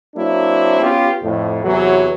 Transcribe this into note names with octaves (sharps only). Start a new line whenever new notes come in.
F#3 A#3 C4 D4 E4
B3 C#4 F4 G4
F2 A2
E2 C3 E3 F#3